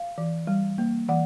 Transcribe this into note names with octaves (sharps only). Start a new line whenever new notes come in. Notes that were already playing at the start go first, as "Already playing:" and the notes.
Already playing: F5
E3
G3
A#3
E3 F#5